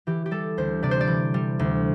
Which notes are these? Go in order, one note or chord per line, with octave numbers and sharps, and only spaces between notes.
E3 G4
G4
G3 A4
D2 C5
C3 D5
C5
D5
E3
G3
D2